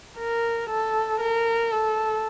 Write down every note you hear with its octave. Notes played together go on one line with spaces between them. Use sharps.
A#4
A4
A#4
A4